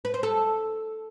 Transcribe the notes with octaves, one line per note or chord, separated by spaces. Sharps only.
B4
C5
A4